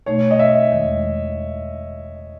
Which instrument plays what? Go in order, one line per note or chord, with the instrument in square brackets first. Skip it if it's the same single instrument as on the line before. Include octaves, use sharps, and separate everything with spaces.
[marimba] B2 A3 D#4 [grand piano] C#5
[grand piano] D#5
E5
[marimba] E2 D#3 G#3